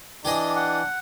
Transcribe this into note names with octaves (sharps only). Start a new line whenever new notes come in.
E3 D4 G4 G#4 D#5
F#5